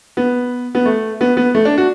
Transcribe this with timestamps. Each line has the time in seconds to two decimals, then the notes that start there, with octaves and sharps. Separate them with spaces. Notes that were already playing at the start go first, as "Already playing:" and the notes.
0.17 B3
0.75 B3
0.86 A3
1.21 B3
1.37 B3
1.55 A3
1.65 D4
1.78 F#4